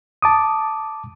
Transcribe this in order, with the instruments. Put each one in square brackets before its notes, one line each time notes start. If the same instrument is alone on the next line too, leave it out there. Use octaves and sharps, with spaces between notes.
[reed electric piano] A5 D6 D#6